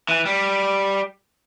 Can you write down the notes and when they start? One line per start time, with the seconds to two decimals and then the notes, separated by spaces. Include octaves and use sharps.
0.09 E3
0.26 G3